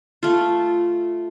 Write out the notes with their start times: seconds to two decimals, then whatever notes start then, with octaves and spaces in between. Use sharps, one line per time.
0.23 A3 F4